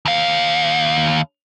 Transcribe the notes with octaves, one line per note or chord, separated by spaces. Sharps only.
D#2 F5